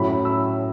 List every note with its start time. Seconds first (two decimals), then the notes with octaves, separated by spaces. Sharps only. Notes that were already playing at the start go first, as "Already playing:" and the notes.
Already playing: A2 F#3 C#4 B5
0.25 E6